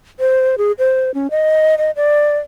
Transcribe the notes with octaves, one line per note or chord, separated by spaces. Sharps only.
C5
G#4
C5
C#4
D#5
D#5
D5